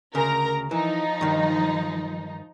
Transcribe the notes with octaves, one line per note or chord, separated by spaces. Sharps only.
D2 C#3 A#4 A#5
E3 F3 D#4
G2 D#3